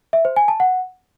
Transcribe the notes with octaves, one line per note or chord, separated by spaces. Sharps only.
E5
C5
G#5
A5
F#5